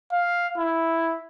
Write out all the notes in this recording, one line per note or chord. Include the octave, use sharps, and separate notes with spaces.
F5
E4